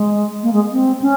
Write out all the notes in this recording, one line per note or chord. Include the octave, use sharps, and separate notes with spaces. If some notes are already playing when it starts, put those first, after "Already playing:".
Already playing: G#3
A#3
G#3
C4
C#4